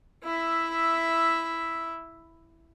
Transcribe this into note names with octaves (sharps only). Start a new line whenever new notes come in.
E4 E5